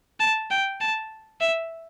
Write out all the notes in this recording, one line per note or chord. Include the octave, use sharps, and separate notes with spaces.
A5
G5
A5
E5